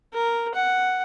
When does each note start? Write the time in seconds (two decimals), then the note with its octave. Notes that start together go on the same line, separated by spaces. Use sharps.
0.13 A#4
0.55 F#5